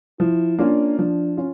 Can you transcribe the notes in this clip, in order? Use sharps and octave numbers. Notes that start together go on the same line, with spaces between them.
F3 E4
A#3 C#4 D4 F4
F3 D4
C#4 F4